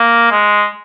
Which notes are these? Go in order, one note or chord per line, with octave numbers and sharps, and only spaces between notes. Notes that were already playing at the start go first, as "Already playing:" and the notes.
Already playing: A#3
G#3